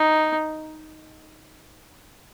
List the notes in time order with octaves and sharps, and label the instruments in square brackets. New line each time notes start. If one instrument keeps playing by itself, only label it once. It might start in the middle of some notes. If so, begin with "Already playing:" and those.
Already playing: [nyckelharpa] D#4